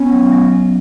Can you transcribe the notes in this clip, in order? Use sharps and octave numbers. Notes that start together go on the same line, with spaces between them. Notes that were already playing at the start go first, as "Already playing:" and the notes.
Already playing: B3 C#4
F#3
F#3
B3